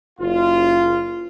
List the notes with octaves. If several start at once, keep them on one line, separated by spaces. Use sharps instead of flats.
F#1 F4